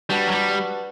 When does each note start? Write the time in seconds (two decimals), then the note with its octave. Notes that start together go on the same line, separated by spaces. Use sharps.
0.09 G3 D4 F#4 B4 F#5 A5
0.27 F#3
0.33 G3